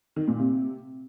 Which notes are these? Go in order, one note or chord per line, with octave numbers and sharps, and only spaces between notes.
D#3
A#2
C3